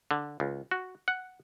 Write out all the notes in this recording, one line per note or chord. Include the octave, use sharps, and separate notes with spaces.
D3
C#2
F#4
F#5